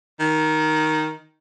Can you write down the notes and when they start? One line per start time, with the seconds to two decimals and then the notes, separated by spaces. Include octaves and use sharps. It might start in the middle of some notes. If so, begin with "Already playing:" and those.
0.20 D#3